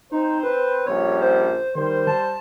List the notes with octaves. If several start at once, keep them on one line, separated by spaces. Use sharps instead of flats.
C4 D#4 C5
B4
A#1 C#3 G3 C#5
C5
D#3 G3 C5
A5